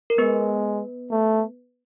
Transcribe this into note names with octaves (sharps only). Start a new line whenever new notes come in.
A#4
G#3 B3 B4
A3